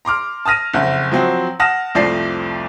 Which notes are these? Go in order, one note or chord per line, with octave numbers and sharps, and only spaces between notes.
A#5 C6 D6 F6
A5 D#6 F6 A#6 D#7
F#1 F2 F#5
F3 F#3 C4 F#4
F#5 A5 D#6 F6 A#6 E7
C2 F2 F3 A3 D5 C7